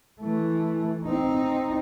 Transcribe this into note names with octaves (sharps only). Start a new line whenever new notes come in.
E3 A3
C4 D#4